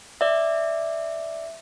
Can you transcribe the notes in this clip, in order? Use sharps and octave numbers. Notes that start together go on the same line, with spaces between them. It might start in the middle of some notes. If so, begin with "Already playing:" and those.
D5 E5